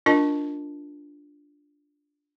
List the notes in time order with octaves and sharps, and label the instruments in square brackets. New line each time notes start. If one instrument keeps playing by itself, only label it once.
[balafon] D4 F4 A#4 D#5 A5